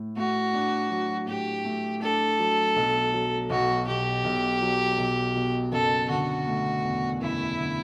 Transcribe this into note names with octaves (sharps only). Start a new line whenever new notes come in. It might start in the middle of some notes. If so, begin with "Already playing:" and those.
Already playing: A2
A3 F#4
D4
F#3
A2 G4
A3
D4 A4
F#3
B1
F#3
B1 F#4
B2 G4
B1
F#3
B1
B2
F#1 A4
D3 F#4
A3
E2
F#1 E4
D3